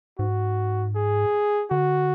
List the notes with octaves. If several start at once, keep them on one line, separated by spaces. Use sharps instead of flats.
G#2 F#4
G#4
D3 F#4